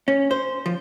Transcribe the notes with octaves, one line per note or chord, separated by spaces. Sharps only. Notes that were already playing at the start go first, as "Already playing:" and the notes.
C#4
C5
F3